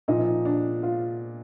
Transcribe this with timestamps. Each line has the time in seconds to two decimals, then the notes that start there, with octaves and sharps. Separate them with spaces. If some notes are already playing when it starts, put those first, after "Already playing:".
0.08 A#2 F3 D#4
0.45 D4
0.83 F4